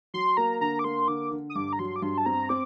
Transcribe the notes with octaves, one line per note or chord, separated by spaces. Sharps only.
F#3 C6
A#3 A#5
D3 A#5
D6
A#3 C6
D3 D6
D3
D#6
G2 D6
A#5
F#3 C6
D6
G2 C6
A5
C4 A#5
C4 D6